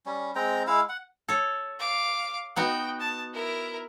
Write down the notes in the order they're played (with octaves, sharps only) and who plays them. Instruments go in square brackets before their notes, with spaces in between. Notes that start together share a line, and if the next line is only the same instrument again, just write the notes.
[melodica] G3 C#4
G#3 C4 G5 A#5
G#3 E4 F5 E6
F#5
[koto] A4 C#5
[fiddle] F5 D6
[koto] B3 D#4 F#4 [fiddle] G5
[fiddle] A5
E4 A#4